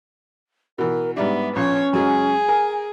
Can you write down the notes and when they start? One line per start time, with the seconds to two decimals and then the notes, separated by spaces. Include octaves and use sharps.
0.78 B2 E3 A#4
1.17 G#2 G3 B3 D4 E5
1.56 A#1 C#4 C#5
1.93 F#2 F#3 G#3 G#4
2.49 A#4 G#5